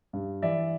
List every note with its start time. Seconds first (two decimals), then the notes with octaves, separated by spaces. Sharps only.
0.13 G2
0.42 E3 D5 E5